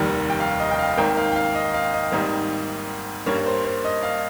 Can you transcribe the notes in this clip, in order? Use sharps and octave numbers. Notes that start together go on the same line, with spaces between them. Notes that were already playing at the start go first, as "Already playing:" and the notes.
Already playing: F1 D#2 D#3 G3 A#3
G5
F5
D#5
G5
F5
G#1 G#2 D#3 A#3 G5
F5
G5
F5
D#5
F5
D#5
G#1 G#2 D#3 G3 A#3
G2 G3 A#3 C#5
C5
C5
D#5
F5